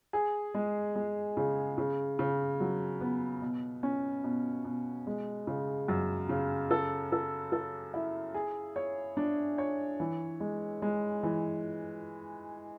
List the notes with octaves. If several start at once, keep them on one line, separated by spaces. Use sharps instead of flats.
G#4
G#3
G#3
C#3
C#3
C#3
F#3
B3
B2
C#4
B2
B2
G#3
C#3
F#2
C#3
A4
A4
A4
E4
G#4
C#5
D4
C#5
E3
G#3
G#3
E3